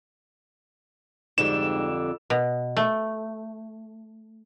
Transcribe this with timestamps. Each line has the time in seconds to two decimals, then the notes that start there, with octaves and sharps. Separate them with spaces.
1.38 F2 G#2 D3 G3 E7
2.30 B2
2.77 A3